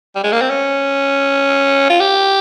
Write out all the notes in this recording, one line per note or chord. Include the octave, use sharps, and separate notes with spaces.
G3
G#3
A#3
C4
C#4
F4
G4